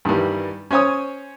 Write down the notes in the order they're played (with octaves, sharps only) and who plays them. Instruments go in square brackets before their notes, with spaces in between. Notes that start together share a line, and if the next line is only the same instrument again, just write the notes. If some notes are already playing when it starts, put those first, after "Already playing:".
[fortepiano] G2 D#3 E3 G3
C#4 C5 C#5 G#5 D#6